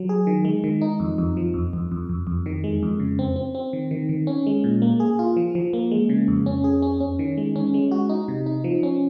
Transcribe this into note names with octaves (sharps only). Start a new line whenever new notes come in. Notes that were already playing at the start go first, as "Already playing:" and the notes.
Already playing: F#3
G#4
D#3
G#3
D#3
D#4
F2
F2
F3
F2
F2
F2
F2
F2
D#3
G#3
F2
C#3
C4
C4
C4
D#3
D#3
D#3
C#4
G#3
A#2
A#3
G#4
F4
F3
F3
A#3
G#3
C#3
F2
C#4
G#4
C#4
C#4
D#3
G#3
C#4
G#3
F#4
D#4
C3
D#4
F3
C#4